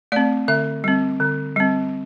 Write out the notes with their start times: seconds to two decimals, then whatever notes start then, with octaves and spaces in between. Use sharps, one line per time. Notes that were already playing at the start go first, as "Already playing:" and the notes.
0.12 A3 C4 D5
0.48 D3 E5
0.84 G3 C4
1.20 D3
1.56 G3 C4